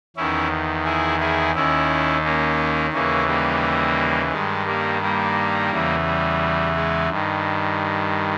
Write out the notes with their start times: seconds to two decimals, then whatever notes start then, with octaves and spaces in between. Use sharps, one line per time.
0.17 E2 D#3 C#4 E4
0.85 E4 G#4
1.20 E4 G#4
1.55 D#2 D#3 C#4 E4
2.24 A#3 C#4
2.93 D#2 C#3 E3 A#3 C#4
3.28 G3 A#3
4.31 G2 D#3 G#3
4.67 G3 A#3
5.02 G3 A#3
5.71 E2 C#3 E3
6.06 G3
6.75 G#3
7.10 G2 D#3